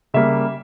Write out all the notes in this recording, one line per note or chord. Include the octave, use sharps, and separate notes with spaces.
C#3 G3 A#3 E5